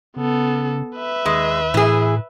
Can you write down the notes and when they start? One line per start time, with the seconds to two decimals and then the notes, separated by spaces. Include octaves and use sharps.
0.17 C#3 B3 A4
0.96 B4 E5
1.26 D#2 G#3
1.74 A2 E3 G#4